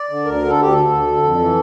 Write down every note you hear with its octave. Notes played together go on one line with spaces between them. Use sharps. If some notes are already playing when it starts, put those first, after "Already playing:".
Already playing: D5
D3
D2 A#4
D3
A4
D2 G4
D3 A4
D2
D3
F2
E3